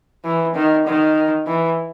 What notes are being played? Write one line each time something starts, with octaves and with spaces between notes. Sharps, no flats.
E3
D#3
D#3
E3